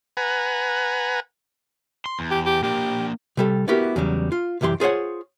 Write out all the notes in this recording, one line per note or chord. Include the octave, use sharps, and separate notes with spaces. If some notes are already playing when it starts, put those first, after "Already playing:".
B4 F#5 G#5 A#5
C6
E2
G4
G4
A#3 D4 G4
C3 G3 A4
A3 B3 E4 F#4 G4 A#4
E2 C#3 F#3 G3
F4
C2 F#2 E3 G4 C6
F4 G#4 C5 C#5 F#5